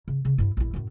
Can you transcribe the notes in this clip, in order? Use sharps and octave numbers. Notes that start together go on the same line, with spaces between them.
C#3
C#3
G2 E4
A#1 E4
F#2 A2